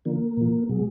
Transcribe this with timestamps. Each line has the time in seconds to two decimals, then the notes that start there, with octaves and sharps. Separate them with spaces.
0.05 D3 F3 A#3
0.37 A#2 F3
0.69 B2 F#3 G#3